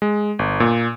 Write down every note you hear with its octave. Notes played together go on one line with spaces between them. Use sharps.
G#3
G1
A#2